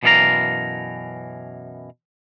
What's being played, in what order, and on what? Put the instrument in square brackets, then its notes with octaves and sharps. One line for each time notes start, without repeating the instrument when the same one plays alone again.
[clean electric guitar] F#2 B2 E3 D5 F5 A#5